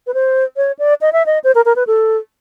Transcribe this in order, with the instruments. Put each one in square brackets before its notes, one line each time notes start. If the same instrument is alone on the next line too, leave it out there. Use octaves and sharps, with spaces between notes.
[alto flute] B4
C5
C#5
D5
D#5
E5
D#5
C5
A#4
A#4
B4
A4